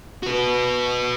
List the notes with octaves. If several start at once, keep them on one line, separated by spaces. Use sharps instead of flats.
F#4 B4